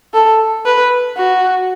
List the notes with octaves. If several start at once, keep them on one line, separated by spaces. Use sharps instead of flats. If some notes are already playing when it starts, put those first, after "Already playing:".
A4
B4
F#4